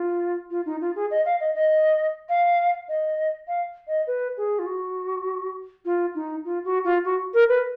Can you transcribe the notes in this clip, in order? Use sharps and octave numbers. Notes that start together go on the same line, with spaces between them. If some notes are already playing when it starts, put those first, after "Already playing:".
Already playing: F4
F4
D#4
F4
G#4
D#5
F5
D#5
D#5
F5
D#5
F5
D#5
B4
G#4
F4
F#4
F4
D#4
F4
F#4
F4
F#4
A#4
B4